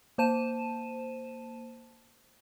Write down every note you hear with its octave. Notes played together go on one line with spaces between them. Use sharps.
A#3 C5 A5 D#7 E7